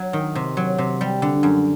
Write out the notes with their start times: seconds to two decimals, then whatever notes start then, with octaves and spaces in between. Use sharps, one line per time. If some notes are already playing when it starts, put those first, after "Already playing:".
Already playing: F#3
0.13 D#3
0.35 C3
0.57 F#3
0.78 C3
1.01 G3
1.22 D3
1.43 F#2